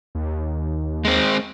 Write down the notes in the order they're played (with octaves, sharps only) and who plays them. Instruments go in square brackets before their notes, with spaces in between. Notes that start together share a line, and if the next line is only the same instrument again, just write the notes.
[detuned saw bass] D#2
[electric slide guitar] G#3 C4